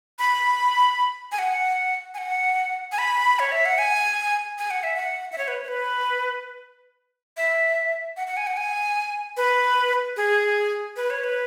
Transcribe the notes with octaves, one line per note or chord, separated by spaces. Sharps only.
B5
G#5
F#5
G#5
F#5
G#5
B5
C#5
E5
F#5
G#5
G#5
F#5
E5
F#5
E5
C#5
B4
C#5
B4
E5
F#5
F#5
G#5
F#5
G#5
B4
G#4
B4
C#5
B4